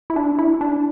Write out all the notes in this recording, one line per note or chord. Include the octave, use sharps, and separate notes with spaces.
E4
D4
E4
D4